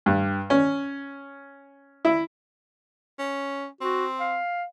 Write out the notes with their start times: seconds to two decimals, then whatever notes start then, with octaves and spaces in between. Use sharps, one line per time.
0.06 G2
0.50 C#4
2.05 E4
3.19 C#4
3.81 C4 F#4
4.20 F5